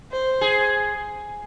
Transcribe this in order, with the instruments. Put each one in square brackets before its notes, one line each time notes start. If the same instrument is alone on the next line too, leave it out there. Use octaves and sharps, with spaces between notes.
[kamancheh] C5
[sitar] G#4